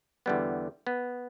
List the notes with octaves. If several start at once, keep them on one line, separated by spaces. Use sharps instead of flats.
E2 D3 G3 B3
B3